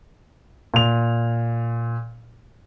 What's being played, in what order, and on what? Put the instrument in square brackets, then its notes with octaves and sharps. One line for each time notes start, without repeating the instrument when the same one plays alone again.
[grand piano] A#2 F7